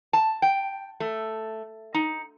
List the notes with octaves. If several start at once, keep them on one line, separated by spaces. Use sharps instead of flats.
A5
G5
A3
D#4